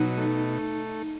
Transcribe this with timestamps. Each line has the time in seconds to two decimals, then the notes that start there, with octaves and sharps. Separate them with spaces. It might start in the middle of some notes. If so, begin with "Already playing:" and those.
Already playing: B2 F#3 D#4
0.18 A3